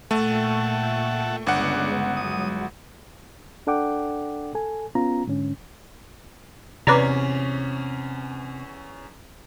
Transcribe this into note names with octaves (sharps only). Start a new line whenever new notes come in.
A#2 A3 A4 E5 F#5 G5 C#6
G1 C#3 G#3 B3 D4 F#5
F#3 G#3 D#6
D4 A4 D5 F#5 G5 D6
A4 G#5
B3 C#4 F4 A#5
G#2 D3 C#4
E2 C3 C#4 B4 D5 A#5